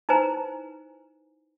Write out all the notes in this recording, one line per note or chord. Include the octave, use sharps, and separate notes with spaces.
D#4 E4 B4 C5 G#5 A#5